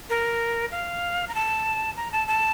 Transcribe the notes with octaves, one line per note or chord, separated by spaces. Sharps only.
A#4
F5
A#5
A5
A#5
A5
A5